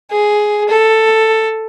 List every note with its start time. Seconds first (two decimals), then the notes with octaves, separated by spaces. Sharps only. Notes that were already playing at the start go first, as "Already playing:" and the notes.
0.12 G#4
0.69 A4